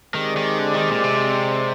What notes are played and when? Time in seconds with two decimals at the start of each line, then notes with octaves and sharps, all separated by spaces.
0.14 D#3 G#3 C4 G4 D5
0.36 D#3
0.59 D3
0.74 D#3
0.89 A#2
1.04 C3